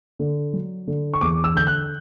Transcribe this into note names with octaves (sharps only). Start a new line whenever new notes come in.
D3
F#3
D3
C#6
E2 D6
E6
D3 G6
F#6